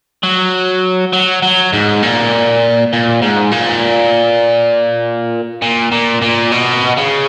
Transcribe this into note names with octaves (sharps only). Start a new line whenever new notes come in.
F#3
F#3
F#3
G#2
A#2
A#2
G#2
A#2
A#2
A#2
A#2
B2
C#3